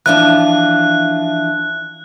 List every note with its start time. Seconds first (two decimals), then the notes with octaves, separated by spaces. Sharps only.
0.06 E3 F3 D4 F#6